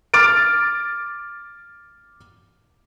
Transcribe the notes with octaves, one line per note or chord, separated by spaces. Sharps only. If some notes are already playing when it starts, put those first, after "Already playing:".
D6 F6 A6 D7